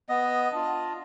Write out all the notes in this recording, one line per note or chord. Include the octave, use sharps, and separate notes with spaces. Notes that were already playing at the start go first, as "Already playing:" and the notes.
B3 D#5
D4 F4